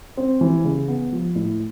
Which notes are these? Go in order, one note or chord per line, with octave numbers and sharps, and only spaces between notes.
C4
E3
C#3
B3
F3
A2